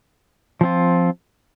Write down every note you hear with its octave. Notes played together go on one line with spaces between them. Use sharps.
F3 C4 F4